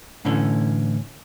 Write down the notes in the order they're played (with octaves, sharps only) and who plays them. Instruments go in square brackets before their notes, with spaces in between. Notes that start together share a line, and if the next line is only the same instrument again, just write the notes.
[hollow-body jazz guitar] A2 D3 E3 C#4